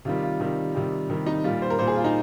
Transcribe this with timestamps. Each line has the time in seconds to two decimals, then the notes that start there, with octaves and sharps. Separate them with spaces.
0.05 C3 D#3 G3 F4
0.23 F4
0.40 C3 D#3 G3
0.75 C3 D#3 G3
1.10 C3 D#3 G3
1.26 D#4
1.44 A#2 G3 F4
1.62 C5
1.70 A#4
1.78 A#2 G3 C5
1.87 G#4
1.96 F4
2.04 D#4